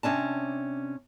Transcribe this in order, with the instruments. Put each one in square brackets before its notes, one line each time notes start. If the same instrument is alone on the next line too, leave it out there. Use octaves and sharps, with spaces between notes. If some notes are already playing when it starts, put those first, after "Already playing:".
[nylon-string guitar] C3 C#4 D4 A5